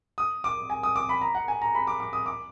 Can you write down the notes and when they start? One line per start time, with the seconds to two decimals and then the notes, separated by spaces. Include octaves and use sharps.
0.18 D#6
0.44 D6
0.70 G#5
0.83 D#6
0.96 D6
1.09 B5
1.21 A#5
1.35 F#5
1.48 G#5
1.62 A#5
1.75 B5
1.87 D6
2.00 D6
2.13 D#6
2.26 D6